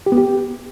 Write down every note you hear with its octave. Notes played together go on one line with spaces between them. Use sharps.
G4
B3
G4